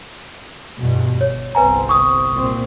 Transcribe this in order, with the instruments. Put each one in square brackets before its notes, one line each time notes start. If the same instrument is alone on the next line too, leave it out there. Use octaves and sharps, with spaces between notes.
[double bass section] E2 G2 B2
[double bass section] G1 [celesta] C#5
[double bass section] G1 C2 C4 [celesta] B4 G#5 A#5
[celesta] C#6 D#6
[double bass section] C2 A#2 C4